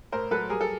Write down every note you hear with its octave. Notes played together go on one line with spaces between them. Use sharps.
A2 A#4 C5
F#3 A4 B4
G3 G#4 A#4
A4